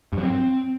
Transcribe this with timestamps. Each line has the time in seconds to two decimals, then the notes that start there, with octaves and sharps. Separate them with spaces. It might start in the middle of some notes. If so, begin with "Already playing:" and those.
0.13 G2
0.18 F#3
0.23 C4